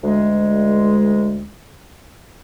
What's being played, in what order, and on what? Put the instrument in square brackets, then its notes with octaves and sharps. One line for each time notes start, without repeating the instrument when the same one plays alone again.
[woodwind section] D2 G#3